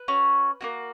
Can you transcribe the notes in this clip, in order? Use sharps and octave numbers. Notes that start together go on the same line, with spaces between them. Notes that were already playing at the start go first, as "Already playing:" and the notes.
Already playing: B4
C#4 F#4
A#3 C#4 F#4